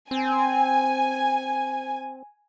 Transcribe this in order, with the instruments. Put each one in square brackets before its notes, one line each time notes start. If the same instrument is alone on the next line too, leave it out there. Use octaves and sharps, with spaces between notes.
[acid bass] C4 [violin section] G#5